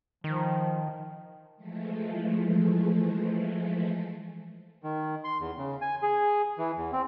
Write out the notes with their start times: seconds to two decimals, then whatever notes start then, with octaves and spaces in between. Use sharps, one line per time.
0.24 D#3 F3
1.56 E3 F3 G#3 A3
4.83 D#3
5.24 C6
5.40 E2
5.58 C#3
5.81 G#5
6.02 G#4
6.58 E3
6.77 E2
6.93 C4